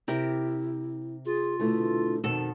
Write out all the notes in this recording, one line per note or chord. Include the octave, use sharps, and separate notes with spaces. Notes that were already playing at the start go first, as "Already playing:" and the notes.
C3 E4 G4 A#4
F4 G#4
B2 D3 A3 E4
F2 B2 D#3 A4